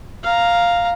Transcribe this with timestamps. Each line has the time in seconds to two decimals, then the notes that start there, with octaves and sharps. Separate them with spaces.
0.24 F5 A#5